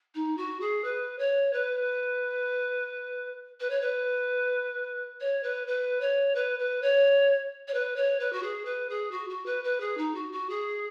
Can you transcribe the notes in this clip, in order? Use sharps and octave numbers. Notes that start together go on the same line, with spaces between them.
D#4
F#4
G#4
B4
C#5
B4
B4
C#5
B4
C#5
B4
B4
C#5
B4
B4
C#5
C#5
B4
C#5
B4
F#4
G#4
B4
G#4
F#4
F#4
B4
B4
G#4
D#4
F#4
F#4
G#4